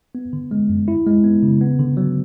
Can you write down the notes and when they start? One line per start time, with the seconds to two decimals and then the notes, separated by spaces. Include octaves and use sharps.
0.15 B3
0.33 D3
0.51 G#3
0.69 F#2
0.88 E4
1.07 G#3
1.24 B3
1.43 C#3
1.61 B3
1.79 D3
1.97 F#3